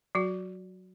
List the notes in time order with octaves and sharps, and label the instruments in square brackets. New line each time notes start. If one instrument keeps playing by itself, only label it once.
[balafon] F#3 F#4